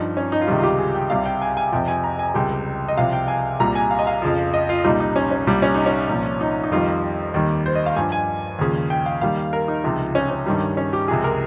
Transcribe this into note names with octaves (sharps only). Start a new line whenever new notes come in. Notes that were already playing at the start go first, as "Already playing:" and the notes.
Already playing: G2 F3 D#4
C#4
D#4
F4
C#2 C3 D#3 G3 D#4
F4
G4
G#4
G5
C2 C3 G3 F5
G5
G#5
G#5
F2 C3 F3 G5
G#5
A#5
G#5
C#2 C3 G3 G5
D#5
C2 C3 F3 F5
G5
G#5
C2 A#2 G3 A#5
G#5
F5
D#5
F5
F2 C#3 F3
D#5
F4
C2 A#2 G3 D#4
D#4
C#4
C#4
C2 A#2 G3
C#4
D#4
C#4
C2 A#2 F3
D#4
D#4
F2 D#3 G3 F4
D#2 D#3 G3
C5
D#5
F5
G2 F3 G#5
G#5
D#2 C#3 F3
G5
F5
D#2 D#3 G3 F5
A#4
D#4
C#2 C3 F3
C#4
C#4
G2 D#3 G3
C#4
G4
C#2 C3 F3 G#4
A#4